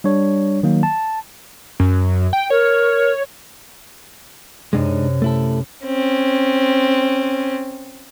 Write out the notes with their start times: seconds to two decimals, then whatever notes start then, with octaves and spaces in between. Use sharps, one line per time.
0.04 G3 D4 C#5
0.63 D#3 F#3 A#3
0.83 A5
1.80 F#2
2.33 G5
2.50 A#4 C#5
4.73 F#2 C3 G#3 D4 D#4
5.22 A3 E4 A4
5.86 C4 C#4